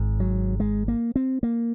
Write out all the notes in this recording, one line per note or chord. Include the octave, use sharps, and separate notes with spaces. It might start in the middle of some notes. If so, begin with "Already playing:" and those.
Already playing: G#1 G#2
F#3
G#3
A#3
C4
A#3